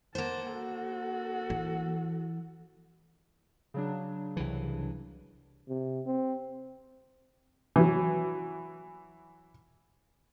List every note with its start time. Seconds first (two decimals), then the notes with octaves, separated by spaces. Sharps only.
0.15 A#3 C5 F#5 A5
0.55 F#4 A4
1.50 E3
3.74 C#3 F#3 D4
4.37 C2 E3
5.68 C3
6.06 C4
7.76 E3 F#3